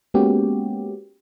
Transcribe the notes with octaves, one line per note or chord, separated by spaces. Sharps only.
G#3 A#3 B3 C#4 F#4 G4